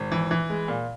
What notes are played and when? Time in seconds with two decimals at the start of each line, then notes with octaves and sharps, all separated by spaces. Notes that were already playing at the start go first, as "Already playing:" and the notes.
Already playing: G#1
0.12 E3
0.31 E3
0.50 G#3
0.68 A#2